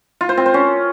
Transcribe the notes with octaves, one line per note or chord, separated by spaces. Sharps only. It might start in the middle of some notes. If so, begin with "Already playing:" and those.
F4
C5
C4
C5
C#4